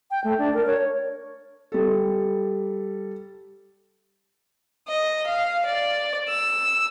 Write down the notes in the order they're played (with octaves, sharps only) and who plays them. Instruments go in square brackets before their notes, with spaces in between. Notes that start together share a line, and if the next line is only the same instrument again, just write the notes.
[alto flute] G5
A3
D4
A#4
C#5
[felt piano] G3 A4
[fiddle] D#5
F5
D5
E6